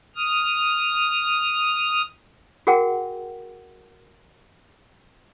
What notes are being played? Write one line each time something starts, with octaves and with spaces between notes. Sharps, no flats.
D#6 F6
F#4 G#4 A#4 F#5 G5